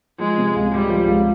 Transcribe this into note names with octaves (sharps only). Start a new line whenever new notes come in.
F3 G#3
C3
C#2
C#2 G3
F3
C#2